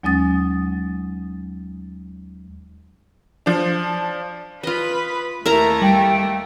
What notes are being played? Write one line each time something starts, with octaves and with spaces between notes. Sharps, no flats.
D#2 F#3 G#3 C#4 D#6 A6
F3 D4
F4 B4 D#5 B5
D#2 A3 E4 A#4 A#5
G3 G5